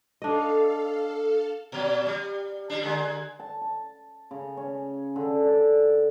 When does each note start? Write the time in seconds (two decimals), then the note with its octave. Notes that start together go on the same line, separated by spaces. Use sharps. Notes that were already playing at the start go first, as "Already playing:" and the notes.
0.22 D4 A4 D#5 F5
1.72 A#2 F#3
2.07 G3
2.70 G3 D4
2.83 D3 G#3
3.40 A5
3.62 A5
4.31 C#3
4.57 C#4
5.16 D3
5.45 D5